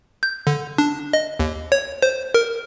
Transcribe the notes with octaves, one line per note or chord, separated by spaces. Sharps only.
G6
D3
D4
D#5
D#2
C#5
C5
A#4